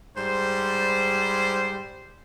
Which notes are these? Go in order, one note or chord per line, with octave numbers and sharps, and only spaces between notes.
G#2 G3 C5